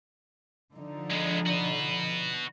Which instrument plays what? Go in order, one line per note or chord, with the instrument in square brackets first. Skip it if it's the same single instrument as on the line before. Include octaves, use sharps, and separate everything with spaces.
[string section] D3 F3 D#4
[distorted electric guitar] G#3 B3
F#4 B4